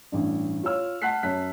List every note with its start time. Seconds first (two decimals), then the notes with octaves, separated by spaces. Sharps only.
0.12 A1 G2
0.63 F4 C#5 E6 F6
1.02 F#5 A5 F#6 B6 C7
1.23 F#2 C#5 A5 F#6 B6